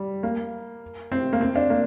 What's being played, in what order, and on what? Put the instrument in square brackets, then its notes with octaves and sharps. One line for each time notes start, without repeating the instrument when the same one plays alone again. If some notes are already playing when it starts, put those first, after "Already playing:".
Already playing: [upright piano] G3
A#3
C4
A#3
C4
D4
A#3